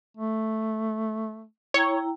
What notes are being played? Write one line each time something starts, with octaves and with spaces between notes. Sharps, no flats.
A3
E4 C#5 G5 A#5